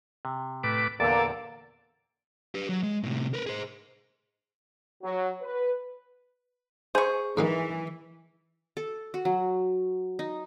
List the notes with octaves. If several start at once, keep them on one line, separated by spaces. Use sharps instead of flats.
C3
A2 B4 D6
E2 A#2 D3 A#3 A4 D5
G4 B4
F#3
G#3
A2 C3
A#4 B4
G#4 C5
F#3
B4
G#4 C5 C#6
G#2 E3 A#3 D#4
A4
F#4
F#3
D#4